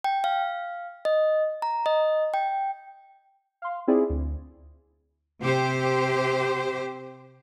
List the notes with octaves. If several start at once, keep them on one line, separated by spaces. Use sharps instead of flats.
G5
F5
D#5
A#5
D#5
G5
F5 C6
C4 E4 F4 G#4 D5
D2
C3 G4 C5